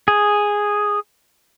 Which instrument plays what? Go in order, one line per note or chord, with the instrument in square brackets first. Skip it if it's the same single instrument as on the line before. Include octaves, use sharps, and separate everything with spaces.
[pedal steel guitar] G#4